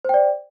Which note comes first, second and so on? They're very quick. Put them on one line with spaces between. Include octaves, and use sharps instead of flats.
C5 G5 D5